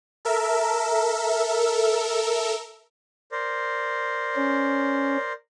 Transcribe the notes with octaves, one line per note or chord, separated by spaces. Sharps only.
A4 A#4 E5
A#4 C5 D5
C#4